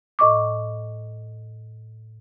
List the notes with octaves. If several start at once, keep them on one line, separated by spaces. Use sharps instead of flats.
A2 D#5 C#6 D6